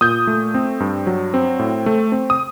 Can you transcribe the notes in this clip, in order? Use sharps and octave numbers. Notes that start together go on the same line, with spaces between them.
A#2 D#6 G6
A3
C4
G2
F#3
C4
A2
A3
C4
D#6